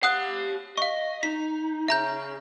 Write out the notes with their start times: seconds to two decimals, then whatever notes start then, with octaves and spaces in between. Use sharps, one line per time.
0.03 G4 F5 F#5 D#6 F#6
0.78 D#5 F5 C#6
1.23 D#4 B6
1.88 C#3 E5 A#5 G6